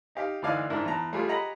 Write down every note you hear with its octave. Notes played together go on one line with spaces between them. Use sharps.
D#4 G4 F5
D2 E3 D#4 D5 F5 G#5
G#2 D4 E4 A#4
E2 A5 A#5
G3 A3 F4 G#4
G4 G#4 D#5 F#5 A#5 B5